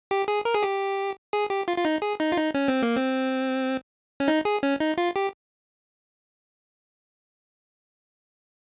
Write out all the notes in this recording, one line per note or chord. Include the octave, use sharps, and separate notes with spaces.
G4
G#4
A#4
G#4
G4
G#4
G4
F4
F4
D#4
G#4
D#4
F4
D#4
C#4
C4
A#3
C4
C#4
D#4
G#4
C#4
D#4
F4
G4